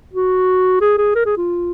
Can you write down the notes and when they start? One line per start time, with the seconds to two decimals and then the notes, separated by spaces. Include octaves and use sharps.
0.14 F#4
0.81 G#4
0.98 G#4
1.15 A#4
1.26 G#4
1.37 F4